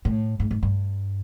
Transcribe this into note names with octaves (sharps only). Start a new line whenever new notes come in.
A2
G#2
G#2
G2